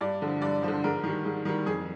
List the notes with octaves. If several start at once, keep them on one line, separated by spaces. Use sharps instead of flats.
G2 D5
D3 F3
G2 D5
F3 C5
D3
G#2 A#4
D#3 G3
G#2
D#3 G3
F2 G#4